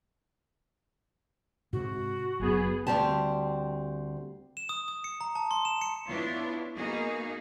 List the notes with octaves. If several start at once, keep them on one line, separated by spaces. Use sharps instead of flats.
G#2 C3 F#4
F#1 F#2 B3 G#4
D2 A#2 G3 C4 G4 A5
E7
D#6
D#6
C#7
A#5
A5
C6
E7
C#7
B3 D4 E4 F4 C#5
A#3 B3 D#4 F#4 G#4